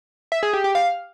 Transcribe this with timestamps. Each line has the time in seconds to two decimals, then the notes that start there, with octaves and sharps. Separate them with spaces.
0.32 E5
0.43 G#4
0.53 G4
0.64 G4
0.75 F5